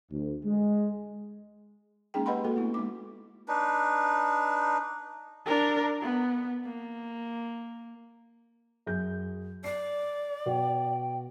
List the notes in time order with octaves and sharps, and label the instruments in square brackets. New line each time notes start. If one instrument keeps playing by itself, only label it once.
[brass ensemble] D2
G#3
[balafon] G#3 A#3 C#4 D#4 G#4 G5
G4 B4 D#5 F#5 B5 C6
A#3 F#4 A4
A3 B3 E4
G#3 D#4 D6
[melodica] D4 D#4 B4
[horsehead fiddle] D4 A#4
B3
A#3
[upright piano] F#2 G#4 G6
[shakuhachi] D5 [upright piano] C7
[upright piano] B2 F#4 [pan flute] G5